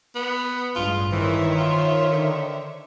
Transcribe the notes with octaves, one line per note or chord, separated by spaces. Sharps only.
B3
A1 G2 G#3 F4
D#3 E3 C5 C#5 E5
F4
D3